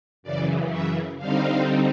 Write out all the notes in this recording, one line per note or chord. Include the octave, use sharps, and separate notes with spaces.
F#2 C#3 E3 D5
E5
D3 G3 C4 D#4 F5